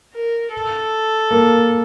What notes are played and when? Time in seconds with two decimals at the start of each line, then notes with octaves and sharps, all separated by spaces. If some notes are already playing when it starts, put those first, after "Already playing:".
0.14 A#4
0.53 A4
1.31 A#3